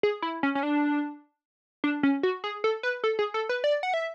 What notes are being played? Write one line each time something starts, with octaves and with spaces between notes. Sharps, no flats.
G#4
E4
C#4
C#4
D4
D4
C#4
F#4
G#4
A4
B4
A4
G#4
A4
B4
D5
F#5
E5